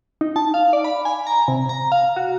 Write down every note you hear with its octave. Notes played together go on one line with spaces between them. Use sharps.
D#4
A5
F5
D5
B5
G#5
A#5
C3
A#5
F5
F#4